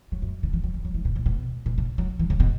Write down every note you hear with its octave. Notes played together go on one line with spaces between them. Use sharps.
F#3
F#2
C#3
E3
F#3
E3
F#3
E3
B2
A2
B2
B2
C#3
F#3
E3
C#3
B2